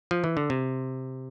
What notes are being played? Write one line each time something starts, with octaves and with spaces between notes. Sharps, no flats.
F3
E3
D3
C3